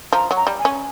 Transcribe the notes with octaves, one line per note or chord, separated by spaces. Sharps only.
F3 A#5
F#3
A#5
G3
G#5
C#4